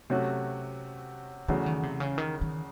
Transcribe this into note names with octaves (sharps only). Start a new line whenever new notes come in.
C3 F#3 A3 C#4 F#4
E2 C#3 E3 F#3 A3
D#3
C3
C#3
D#3
D#3